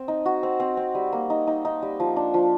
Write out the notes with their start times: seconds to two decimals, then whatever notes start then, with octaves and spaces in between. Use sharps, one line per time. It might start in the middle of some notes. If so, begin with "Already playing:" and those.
Already playing: C4
0.08 D#4
0.25 F#4
0.43 C4
0.60 C4
0.77 C4
0.95 G3
1.12 A#3
1.30 D#4
1.47 D#4
1.65 D#4
1.82 G3
2.00 F3
2.16 D4
2.34 F3